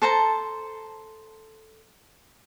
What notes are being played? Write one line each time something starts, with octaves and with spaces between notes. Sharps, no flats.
A4 C5 A5 A#5